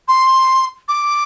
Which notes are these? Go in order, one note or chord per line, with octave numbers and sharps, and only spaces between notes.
C6
D6